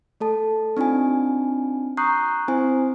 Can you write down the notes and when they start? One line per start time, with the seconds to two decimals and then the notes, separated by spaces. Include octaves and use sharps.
0.21 A3 A4 A5
0.77 C4 D4 D#4 F4 G#5
1.97 A#5 C#6 D#6 F#6 G6 C7
2.48 C4 E4 C5 G#5